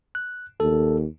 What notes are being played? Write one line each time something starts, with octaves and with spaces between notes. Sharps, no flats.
F#6
D#2 A4